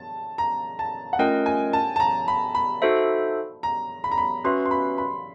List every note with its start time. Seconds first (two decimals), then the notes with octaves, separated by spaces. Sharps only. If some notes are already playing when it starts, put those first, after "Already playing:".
Already playing: A5
0.38 A#5
0.79 A5
1.13 F#5
1.19 A3 C#4 F4 A#4 D#5 G5
1.46 G#5
1.73 A5
1.96 A5
2.00 A#5
2.28 B5
2.55 B5
2.82 D#4 F#4 A4 C5 E5
3.63 A#5
4.04 B5
4.12 A#5
4.18 B5
4.44 C#4 F#4 B4 E5 C6
4.65 C6
4.71 B5
4.98 B5